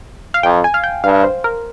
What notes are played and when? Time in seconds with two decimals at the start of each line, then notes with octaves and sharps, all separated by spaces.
0.34 F5
0.43 F2 G5
0.64 G#5
0.74 F5
0.84 G5
1.04 G2 F5
1.24 C5
1.44 A#4